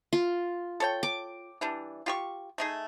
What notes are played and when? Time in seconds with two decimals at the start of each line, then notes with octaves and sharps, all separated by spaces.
0.13 F4
0.80 A4 C#5 G5
1.03 D6
1.61 E3 G3 D4
2.06 F4 G4 C#6
2.58 A3 D#4 G#4